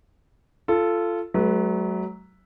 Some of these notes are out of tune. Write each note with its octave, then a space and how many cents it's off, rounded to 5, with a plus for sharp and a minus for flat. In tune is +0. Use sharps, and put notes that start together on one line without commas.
F4 -15 A4 +0
F#3 +15 A3 -45 B4 +0